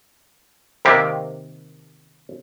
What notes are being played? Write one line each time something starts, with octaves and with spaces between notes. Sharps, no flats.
C3 D#3 A#3 G4